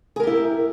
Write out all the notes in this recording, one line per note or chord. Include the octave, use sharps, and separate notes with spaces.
E4 G4 G#4 A#4